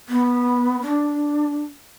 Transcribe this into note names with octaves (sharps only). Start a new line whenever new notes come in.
B3
D4